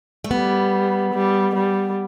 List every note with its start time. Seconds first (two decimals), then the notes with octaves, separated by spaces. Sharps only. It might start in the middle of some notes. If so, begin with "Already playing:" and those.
0.24 A3
0.31 G3 B3
1.14 G3
1.55 G3